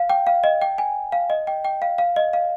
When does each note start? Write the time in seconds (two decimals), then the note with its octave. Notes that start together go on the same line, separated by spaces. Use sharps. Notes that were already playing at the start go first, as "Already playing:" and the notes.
Already playing: F5
0.10 G5
0.27 F5
0.44 D#5
0.62 G5
0.78 G#5
1.12 F5
1.30 D#5
1.47 G5
1.65 G5
1.82 F5
1.98 F5
2.16 D#5
2.33 F5